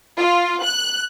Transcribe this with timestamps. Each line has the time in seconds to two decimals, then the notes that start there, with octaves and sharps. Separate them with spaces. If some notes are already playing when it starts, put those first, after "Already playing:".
0.18 F4
0.62 F#6